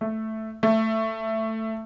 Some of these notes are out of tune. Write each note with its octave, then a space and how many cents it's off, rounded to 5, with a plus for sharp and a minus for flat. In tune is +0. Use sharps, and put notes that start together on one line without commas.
A3 +0
A3 +10